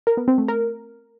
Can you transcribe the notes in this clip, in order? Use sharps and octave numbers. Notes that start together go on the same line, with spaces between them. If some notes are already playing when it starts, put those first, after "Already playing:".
A#4
B3
C4
A3
A#4